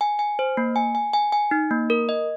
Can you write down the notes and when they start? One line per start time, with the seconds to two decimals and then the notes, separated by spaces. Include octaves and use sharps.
0.01 G#5
0.19 G#5
0.39 C5
0.57 A#3
0.76 G#5
0.95 G#5
1.14 G#5
1.32 G#5
1.51 D#4
1.71 A#3
1.90 A#4
2.09 D#5